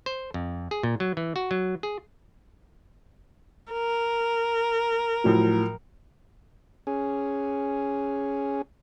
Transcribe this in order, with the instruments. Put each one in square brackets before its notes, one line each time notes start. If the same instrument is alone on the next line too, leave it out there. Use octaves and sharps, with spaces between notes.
[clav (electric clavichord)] C5
F2
G#4
A#2
F#3
E3
F#4
F#3
G#4
[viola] A#4
[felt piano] A2 F3 F#3
[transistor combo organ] C#4 G#4